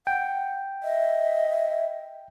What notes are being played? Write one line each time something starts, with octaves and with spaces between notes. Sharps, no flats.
F#5 G5
D#5 E5